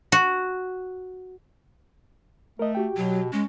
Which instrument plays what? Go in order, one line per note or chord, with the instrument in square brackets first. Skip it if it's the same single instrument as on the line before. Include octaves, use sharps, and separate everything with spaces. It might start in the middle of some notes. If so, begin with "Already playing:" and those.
[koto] F#4
[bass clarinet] A3 [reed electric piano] A#4 D#5
[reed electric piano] F#4 G4 G5
[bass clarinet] B2 [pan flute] F#3
[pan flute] G#3 [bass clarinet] C#4